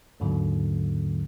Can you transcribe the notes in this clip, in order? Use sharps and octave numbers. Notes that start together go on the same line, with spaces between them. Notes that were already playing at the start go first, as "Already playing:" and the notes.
D#2 G#2 B2 D3 F#3 A#3